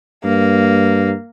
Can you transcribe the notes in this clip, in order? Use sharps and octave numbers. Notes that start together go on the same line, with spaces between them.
G2 A#3